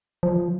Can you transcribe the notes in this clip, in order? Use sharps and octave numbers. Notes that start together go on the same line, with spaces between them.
F3